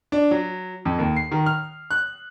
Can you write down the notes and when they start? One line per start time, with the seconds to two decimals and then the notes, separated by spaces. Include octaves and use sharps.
0.12 D4
0.31 F#3
0.85 F2
0.99 D#2
1.16 C7
1.32 D#3
1.46 F6
1.91 F#6